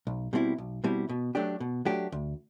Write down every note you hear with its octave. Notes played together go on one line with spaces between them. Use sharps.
B1
B2 G3 C4 E4
B1
B2 G3 C4 E4
B2
F#3 A3 D4 G4
B2
F#3 A3 D4 G4
D2